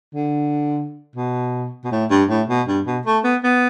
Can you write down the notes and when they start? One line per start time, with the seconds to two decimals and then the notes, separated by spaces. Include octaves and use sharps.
0.15 D3
1.16 B2
1.84 B2
1.92 A2
2.10 G2
2.30 A2
2.49 B2
2.68 G2
2.86 B2
3.06 A3
3.24 B3
3.44 B3